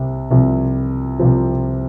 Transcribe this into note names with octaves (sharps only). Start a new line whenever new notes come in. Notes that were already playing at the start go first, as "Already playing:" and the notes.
Already playing: C2 C3
C2 C3 F3
C2 C3 F3